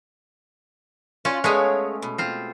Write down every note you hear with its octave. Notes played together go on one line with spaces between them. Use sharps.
C#4 F4 F#4
G#3 A3 B3 G#4 C#5 F5
B2
C4 F4